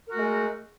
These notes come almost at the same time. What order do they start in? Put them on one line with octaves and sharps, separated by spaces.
A#4 F#4 A3 G#3